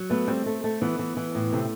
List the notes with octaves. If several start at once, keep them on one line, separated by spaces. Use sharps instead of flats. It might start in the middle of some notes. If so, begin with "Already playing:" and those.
Already playing: F#3
A3 B3
G3 C4
A3
A3
E3 B3
E3
E3
A2
C3 A3